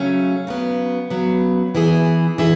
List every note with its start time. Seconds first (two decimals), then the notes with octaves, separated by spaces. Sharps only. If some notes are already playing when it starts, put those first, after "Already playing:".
Already playing: C#3 F#3 A3 C#4
0.47 C#3 F#3 B3
1.10 C#3 F#3 B3
1.75 E3 B3 E4 G#4
2.38 E3 B3 E4 G#4